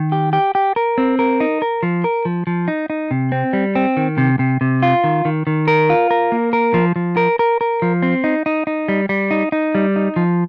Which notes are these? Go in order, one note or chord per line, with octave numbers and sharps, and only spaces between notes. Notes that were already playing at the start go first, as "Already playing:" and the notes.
Already playing: D#3
G4
G4
G4
A#4
C4
A#4
D#4
A#4
F3
A#4
F3
F3
D#4
D#4
C3
C4
G3
C4
D#3
C3
C3
C3
F4
D#3
D#3
D#3
A#4
F4
A#4
A#3
A#4
F3
F3
A#4
A#4
A#4
F3
C4
D#4
D#4
D#4
G3
G3
D#4
D#4
G3
D#4
F3